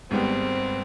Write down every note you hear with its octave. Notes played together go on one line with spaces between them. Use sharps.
G#1 G#2 G3 B3 C4